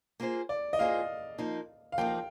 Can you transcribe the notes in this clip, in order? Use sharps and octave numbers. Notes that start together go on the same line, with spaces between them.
A#3 F4 G#4 C5
D5
D#5
A#3 F4 G#4 C5 F5
F3 A#3 D#4
F5
F3 A#3 D#4 G5